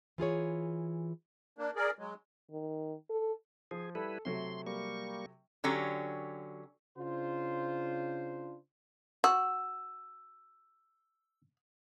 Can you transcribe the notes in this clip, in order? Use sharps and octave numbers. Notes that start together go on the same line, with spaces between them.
E3 F4 G#4 C#5
A#3 D4
G#4 A#4 D5
F#3 G#3
D#3
A4
F3 G#4
G3 E4 A4 B4
C3 F#3 A3 C6
G3 A#3 C#6
D3 F#3 C#4 G4
C#3 D4 F4 C5
F#4 E6